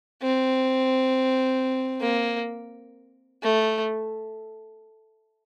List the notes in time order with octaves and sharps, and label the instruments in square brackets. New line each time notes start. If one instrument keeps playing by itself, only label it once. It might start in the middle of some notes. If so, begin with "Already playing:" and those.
[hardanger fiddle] C4
A#3
A3